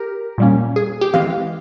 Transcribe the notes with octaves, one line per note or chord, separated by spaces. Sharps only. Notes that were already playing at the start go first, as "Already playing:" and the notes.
Already playing: G4 A#4
A#2 G3 A#3 C#4
G#4
G4
E3 G#3 C4 F5